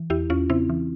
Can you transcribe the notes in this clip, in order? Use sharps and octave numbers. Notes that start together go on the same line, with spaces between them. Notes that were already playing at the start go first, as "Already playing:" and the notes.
Already playing: E3
E2 E4 G4
E2 C#4 F4
C#3 C4 E4
E3